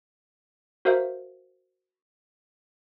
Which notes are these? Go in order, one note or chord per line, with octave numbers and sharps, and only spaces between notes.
F#4 A#4 C5 E5 F5